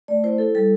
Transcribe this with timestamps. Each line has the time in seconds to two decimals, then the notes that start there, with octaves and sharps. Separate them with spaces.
0.08 A3 D5
0.24 E4 C5
0.38 E4 A4
0.55 G3 A4